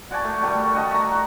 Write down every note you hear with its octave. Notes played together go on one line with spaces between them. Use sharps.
F#4 D5 G#5 A5
A3
G3 A3 F#4 D5
F#4 D#5 A5 C#6
E5 A#5
F#4